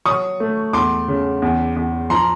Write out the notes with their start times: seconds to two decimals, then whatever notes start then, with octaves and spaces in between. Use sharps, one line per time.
0.05 F#3 C#6 D#6
0.40 A3
0.73 E2 C6 D6
1.08 C#3
1.42 E2
1.76 E2
2.10 F3 A#5 C6